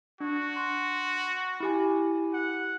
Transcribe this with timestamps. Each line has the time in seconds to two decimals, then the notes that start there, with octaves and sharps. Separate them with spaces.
0.20 D4 F#4
0.56 C6
1.60 E4 G4 G#5
2.33 F#5